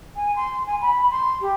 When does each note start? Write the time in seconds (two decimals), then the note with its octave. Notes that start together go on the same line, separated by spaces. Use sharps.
0.16 G#5
0.36 C6
0.67 G#5
0.81 B5
1.11 C6
1.41 G4